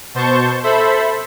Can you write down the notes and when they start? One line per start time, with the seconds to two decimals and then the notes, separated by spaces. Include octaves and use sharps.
0.14 B2 C5 A5 C#6 G6
0.63 A4 C5 E5 B5